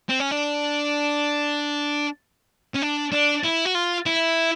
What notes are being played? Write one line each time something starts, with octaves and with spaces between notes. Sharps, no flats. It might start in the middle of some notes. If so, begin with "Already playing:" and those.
C4
C#4
D4
C#4
D4
D4
E4
F#4
F4
E4